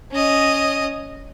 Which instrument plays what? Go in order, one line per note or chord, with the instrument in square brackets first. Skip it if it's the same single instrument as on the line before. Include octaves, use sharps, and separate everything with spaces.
[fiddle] C#4 D#5